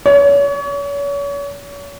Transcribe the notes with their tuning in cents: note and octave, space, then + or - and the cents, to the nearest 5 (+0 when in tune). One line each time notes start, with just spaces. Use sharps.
C#5 +35